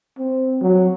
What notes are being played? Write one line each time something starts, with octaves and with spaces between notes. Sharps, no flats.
C4
F#3